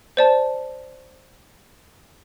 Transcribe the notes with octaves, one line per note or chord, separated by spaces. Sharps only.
C5 D5 A5